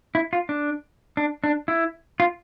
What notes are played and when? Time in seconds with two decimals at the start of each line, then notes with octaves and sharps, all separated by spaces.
0.15 E4
0.33 F4
0.49 D4
1.17 D4
1.44 D4
1.68 E4
2.20 F4